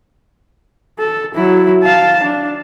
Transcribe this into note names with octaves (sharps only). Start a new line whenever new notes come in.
A4
F#3 E4
F5 A5
D4